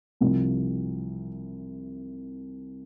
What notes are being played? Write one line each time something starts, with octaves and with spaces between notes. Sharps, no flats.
C2 C3 F3